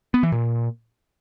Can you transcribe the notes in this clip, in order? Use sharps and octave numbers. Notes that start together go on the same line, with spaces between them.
B3
E3
A#2